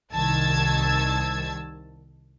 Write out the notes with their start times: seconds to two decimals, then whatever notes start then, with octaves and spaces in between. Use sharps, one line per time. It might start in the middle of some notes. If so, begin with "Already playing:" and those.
0.12 C2 D#3 A5 E6 G#6